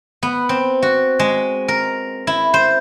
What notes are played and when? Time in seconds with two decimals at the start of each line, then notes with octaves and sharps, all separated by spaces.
0.23 B3
0.49 C4
0.82 F#4
1.19 G#3
1.68 A#4
2.27 E4
2.54 C5